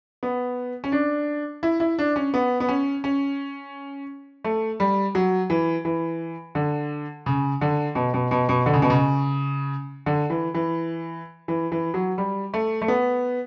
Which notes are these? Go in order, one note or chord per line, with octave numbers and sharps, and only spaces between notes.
B3
C#4
D4
E4
E4
D4
C#4
B3
B3
C#4
C#4
A3
G3
F#3
E3
E3
D3
C#3
D3
B2
B2
B2
B2
D3
C#3
B2
C#3
D3
E3
E3
E3
E3
F#3
G3
A3
A3
B3